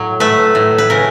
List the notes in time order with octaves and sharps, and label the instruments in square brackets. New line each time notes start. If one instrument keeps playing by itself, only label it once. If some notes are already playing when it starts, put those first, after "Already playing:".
Already playing: [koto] A2 F#3
A3 B4
A2
B4
C#3 A#4